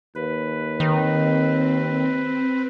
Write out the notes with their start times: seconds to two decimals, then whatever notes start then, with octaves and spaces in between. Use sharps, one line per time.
0.15 D#2 B4
0.80 D#3 C4